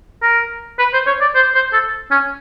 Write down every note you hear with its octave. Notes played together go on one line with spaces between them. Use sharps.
A#4
B4
C5
C#5
D5
C5
C5
A4
C#4